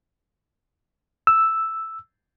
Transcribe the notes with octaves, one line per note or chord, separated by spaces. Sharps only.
E6